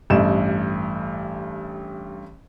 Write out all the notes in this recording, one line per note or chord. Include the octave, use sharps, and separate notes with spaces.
A1 G2 A3 E7